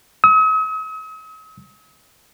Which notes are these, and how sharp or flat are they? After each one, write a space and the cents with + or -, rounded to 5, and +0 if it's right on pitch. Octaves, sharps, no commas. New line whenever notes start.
D#6 +45